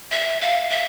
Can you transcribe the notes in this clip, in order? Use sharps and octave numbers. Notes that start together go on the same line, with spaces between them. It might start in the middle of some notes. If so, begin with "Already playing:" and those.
E5
F5
E5